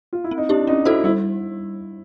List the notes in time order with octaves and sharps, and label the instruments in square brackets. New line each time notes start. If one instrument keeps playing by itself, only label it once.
[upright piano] F4
E4
[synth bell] C4
[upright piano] D#4
[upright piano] D4 [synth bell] E4 G4
[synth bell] C#4 [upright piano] D#4
[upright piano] E4 [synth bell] F#4 A4 C5
[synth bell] G3 [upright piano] E4